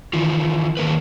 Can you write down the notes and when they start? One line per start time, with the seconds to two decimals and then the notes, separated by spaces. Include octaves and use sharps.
0.14 D#3 E3 F4
0.77 D#3 F3 A#3 A#4 B4